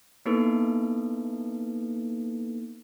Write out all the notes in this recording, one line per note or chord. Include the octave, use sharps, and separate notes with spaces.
A#3 B3 D#4 E4 A4 B4